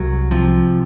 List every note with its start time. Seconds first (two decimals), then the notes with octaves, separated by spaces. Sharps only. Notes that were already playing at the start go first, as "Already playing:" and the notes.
Already playing: C2 F#3
0.31 C3 F3